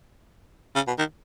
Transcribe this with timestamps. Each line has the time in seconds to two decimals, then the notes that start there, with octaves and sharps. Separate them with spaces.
0.75 C#3
0.87 B2
0.98 D#3